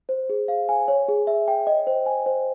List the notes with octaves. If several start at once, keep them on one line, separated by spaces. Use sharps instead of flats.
C5
G#4
F5
G#5
C#5
G#4
E5
G5
D#5
C5
G#5
C5